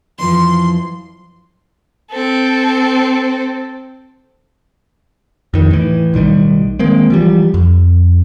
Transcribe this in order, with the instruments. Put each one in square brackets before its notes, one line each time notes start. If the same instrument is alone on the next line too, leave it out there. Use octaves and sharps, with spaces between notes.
[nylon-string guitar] F2 E3 F3 [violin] C6
[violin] C4 A4
[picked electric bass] F2 D#3
A2 E3
B1 A2 D#3 G3
D#3 G#3 A#3 C4
E3 F3 G3
F2